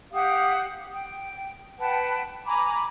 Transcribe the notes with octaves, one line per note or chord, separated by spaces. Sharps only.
G4 F5 F#5 D#6
G5
B4 F#5 G5 A5
G#5 A#5 B5 D6